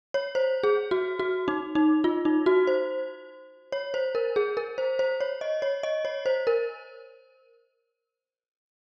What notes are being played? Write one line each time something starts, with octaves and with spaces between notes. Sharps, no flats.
C#5
C5
G#4
F#4
F#4
D#4
D#4
F4
D#4
F#4
C5
C#5
C5
A#4
G#4
A#4
C5
C5
C#5
D#5
C#5
D#5
C#5
C5
A#4